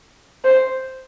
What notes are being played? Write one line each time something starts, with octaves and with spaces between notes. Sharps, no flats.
C5